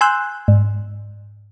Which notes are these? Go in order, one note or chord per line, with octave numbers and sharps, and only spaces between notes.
G#5 C6 E6 F#6 G6
G#2